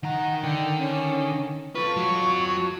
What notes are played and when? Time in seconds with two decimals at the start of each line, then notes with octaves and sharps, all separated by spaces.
0.03 D#3 F#5 A#5
0.43 D3 G5
0.78 C#4
1.75 F4 A4 B4 C#6
1.96 F#3 F#4